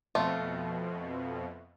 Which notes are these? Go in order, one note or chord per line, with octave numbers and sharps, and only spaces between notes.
F2 B2 A3 F4